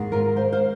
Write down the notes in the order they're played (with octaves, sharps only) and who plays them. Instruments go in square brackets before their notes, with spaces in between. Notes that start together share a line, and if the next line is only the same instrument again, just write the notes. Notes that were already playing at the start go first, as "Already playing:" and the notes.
Already playing: [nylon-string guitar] G#2 D#3 G#3
F4 A#4
C5 F5
C5 F5